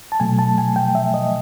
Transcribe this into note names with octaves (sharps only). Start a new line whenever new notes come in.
A5
B2 F#3 A3 G#5
A5
G#5
G5
E5
D#5